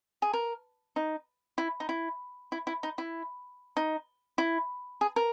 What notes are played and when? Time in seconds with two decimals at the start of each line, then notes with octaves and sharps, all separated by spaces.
0.22 G#4
0.33 A#4
0.96 D#4
1.58 E4
1.80 D#4
1.89 E4
2.52 E4
2.67 E4
2.83 D#4
2.98 E4
3.77 D#4
4.38 E4
5.01 G#4
5.16 A#4